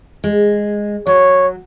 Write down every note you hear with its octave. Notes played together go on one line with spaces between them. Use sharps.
G#3
F#3 C#5